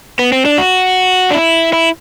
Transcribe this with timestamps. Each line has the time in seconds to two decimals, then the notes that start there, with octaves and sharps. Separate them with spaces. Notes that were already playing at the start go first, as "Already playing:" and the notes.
0.19 B3
0.32 C4
0.45 D4
0.58 F#4
1.31 D4
1.34 E4
1.73 E4